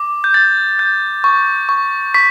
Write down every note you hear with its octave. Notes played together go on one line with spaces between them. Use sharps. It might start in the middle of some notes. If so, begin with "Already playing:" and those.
Already playing: D6
G6
G6 A6
G6
C#6
C#6
C#6 B6